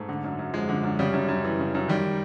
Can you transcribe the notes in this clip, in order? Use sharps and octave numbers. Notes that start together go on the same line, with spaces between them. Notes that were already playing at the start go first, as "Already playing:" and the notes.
Already playing: G#2 A3
D3
F#2
F#2
F3 G#3
D3
F#2
C#3 G3
F#2
F#2
E3
C#3
F#2
D#3 G3